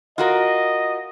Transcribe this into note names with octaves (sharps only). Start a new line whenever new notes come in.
F4 F#4 A#4 D#5